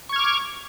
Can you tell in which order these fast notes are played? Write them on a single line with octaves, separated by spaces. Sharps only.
C#6 G#6 F6 D6